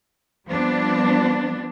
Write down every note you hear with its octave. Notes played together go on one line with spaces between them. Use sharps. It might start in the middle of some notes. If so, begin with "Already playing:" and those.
F3 G3 B3 C4 D4